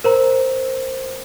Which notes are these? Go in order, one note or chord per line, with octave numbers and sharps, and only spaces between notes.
A#4 C5 A#5